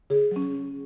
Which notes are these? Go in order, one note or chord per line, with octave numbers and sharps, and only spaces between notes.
C#3 G#4
F#3 C#4